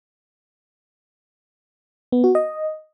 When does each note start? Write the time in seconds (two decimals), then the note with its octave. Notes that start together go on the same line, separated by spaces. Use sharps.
2.12 B3
2.24 F#4
2.35 D#5